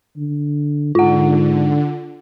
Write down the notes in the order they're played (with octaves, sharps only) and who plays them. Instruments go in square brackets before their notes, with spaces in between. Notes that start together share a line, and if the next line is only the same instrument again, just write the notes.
[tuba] D3
[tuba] G#2 [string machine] D3 [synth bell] F4 F#5